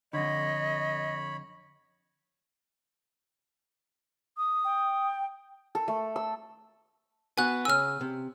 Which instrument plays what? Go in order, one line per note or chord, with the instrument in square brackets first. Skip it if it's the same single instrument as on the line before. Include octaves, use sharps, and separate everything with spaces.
[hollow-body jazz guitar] F2 D3 [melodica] C#5 B5 [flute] D#5
[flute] D#6
[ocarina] G5
[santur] A4
A3
E6
[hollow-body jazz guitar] B3 F#4 [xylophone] G#5 F#6
[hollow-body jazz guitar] C#3 G#5 [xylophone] E6 F6
[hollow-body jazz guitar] C3